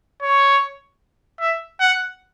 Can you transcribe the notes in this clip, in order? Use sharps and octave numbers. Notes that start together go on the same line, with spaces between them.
C#5
E5
F#5